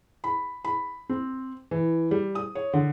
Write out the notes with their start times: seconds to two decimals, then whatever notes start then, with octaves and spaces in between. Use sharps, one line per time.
0.24 B5
0.65 B5
1.09 C4
1.71 E3
2.11 G3
2.35 D#6
2.55 C#5
2.73 D3